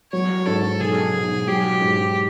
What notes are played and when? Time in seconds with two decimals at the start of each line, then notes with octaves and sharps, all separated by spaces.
0.12 F#3 C#5
0.46 G#2 A4
0.80 B1 G#4
1.14 B1
1.47 F#3 G4
1.81 G#2